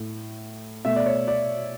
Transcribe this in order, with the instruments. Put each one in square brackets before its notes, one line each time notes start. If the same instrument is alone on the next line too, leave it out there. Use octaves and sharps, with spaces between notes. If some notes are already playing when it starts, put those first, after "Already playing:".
Already playing: [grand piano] A2 A3
B2 A3 E5
D5
C#5
D5